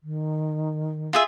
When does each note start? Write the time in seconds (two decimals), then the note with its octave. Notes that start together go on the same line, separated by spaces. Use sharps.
0.03 D#3
1.13 F4 G#4 E5